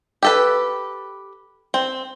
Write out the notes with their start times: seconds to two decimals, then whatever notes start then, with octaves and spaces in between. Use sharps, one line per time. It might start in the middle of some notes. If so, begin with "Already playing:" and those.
0.23 G4 A4 B4
1.74 C4